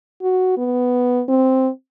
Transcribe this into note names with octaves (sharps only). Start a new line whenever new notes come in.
F#4
B3
C4